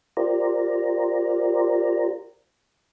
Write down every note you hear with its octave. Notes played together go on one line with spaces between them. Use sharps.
F4 G4 A#4 C5 D5 A#5